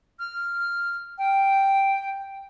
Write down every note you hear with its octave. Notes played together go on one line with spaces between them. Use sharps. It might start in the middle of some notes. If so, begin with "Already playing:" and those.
F6
G5